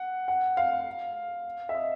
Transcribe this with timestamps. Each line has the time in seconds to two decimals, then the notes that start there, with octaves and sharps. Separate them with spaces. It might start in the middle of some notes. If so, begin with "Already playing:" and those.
Already playing: F#5
0.28 F#5
0.57 F5
1.69 E5
1.75 D#5